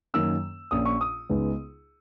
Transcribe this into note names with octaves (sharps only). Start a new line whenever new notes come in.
F#2 D#3 A#3 C#4 E6
A#1 A#2 A#3 C#4 D#6
C#6
D#6
C#2 C#3 G#3 B3 D#4